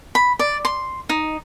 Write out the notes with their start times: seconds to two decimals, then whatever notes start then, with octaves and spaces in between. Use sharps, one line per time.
0.15 B5
0.39 D5
0.65 C6
1.09 D#4